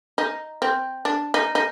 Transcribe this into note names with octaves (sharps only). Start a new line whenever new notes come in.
D#4
C4
D4
D#4
D#4